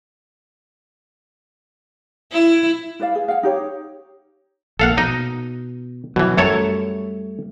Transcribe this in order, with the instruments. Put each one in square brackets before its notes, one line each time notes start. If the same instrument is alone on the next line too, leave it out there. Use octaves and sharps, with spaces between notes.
[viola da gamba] E4
[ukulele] E4 B4 D5 F5
G#4
F5 F#5
D#4 G4 C#5
[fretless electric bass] A#1 A#3 [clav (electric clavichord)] A4 F5 F#5
[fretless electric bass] B2 [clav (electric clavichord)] D#4 D#5
[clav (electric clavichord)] B2 E3 [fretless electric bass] F#3
[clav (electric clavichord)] F#2 A4 C#5 [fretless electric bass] G3 A3